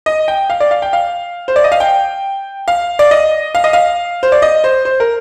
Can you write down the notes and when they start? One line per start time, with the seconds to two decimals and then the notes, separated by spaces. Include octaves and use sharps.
0.06 D#5
0.28 G5
0.50 F5
0.60 D5
0.71 F5
0.82 G5
0.93 F5
1.48 C5
1.56 D5
1.64 D#5
1.72 F5
1.80 G5
2.68 F5
2.99 D5
3.11 D#5
3.55 F5
3.64 D#5
3.73 F5
4.23 C5
4.32 D5
4.42 D#5
4.64 C5
4.85 C5
5.00 A#4